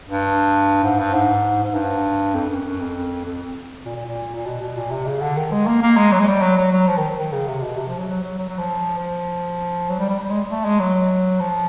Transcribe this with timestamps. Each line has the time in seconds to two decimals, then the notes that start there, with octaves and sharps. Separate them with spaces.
0.08 G2
0.84 G#2
0.98 G2
1.14 G#2
1.63 G#2
1.74 G2
2.35 F2
2.50 F#2
2.64 F#2
2.80 F2
3.25 F2
3.85 A#2
3.95 A#2
4.06 A#2
4.35 A#2
4.46 B2
4.61 B2
4.76 A#2
4.91 C3
5.06 C#3
5.21 D3
5.37 D#3
5.52 G#3
5.66 A#3
5.82 A#3
5.96 G#3
6.12 F#3
6.20 G#3
6.27 G3
6.42 F#3
6.57 F#3
6.72 F#3
6.87 F3
6.97 D#3
7.17 D#3
7.32 C#3
7.47 C3
7.63 B2
7.78 C3
7.88 F3
7.98 F#3
8.08 F#3
8.23 F#3
8.38 F#3
8.48 F#3
8.58 F3
8.98 F3
9.89 F#3
9.99 G3
10.09 G3
10.20 G3
10.29 G#3
10.50 A3
10.65 G#3
10.79 F#3
11.40 F3